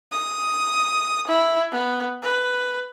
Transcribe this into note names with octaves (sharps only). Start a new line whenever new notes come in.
D#6
E4
B3
B4